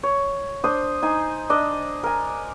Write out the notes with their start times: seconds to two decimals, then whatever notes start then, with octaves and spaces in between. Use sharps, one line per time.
0.03 C#5
0.64 D4 C5 D#6
1.02 D#4 G#5
1.50 D4 D5 D#5
2.03 A#4 G#5